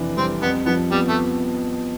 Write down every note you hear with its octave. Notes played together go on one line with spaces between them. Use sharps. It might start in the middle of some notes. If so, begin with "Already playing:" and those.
Already playing: F1 E3 D4
G3 C4
F2 B3
F3 B3
G3 B3
A3